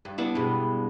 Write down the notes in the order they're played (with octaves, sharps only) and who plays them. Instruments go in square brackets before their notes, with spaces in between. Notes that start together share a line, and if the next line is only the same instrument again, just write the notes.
[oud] G2
[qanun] B3 D4 E4
[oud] G2 B2 G#3